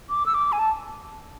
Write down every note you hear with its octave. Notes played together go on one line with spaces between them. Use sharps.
D6
E6
D6
G#5
A5